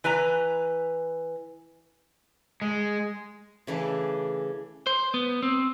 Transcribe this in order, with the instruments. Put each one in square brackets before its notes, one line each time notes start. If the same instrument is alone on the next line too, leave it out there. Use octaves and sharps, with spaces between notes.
[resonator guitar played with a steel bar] E3 B4 G#5 A#5
[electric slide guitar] G#3
[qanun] C#3 E3 A3 D4
[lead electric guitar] C5
B3
C4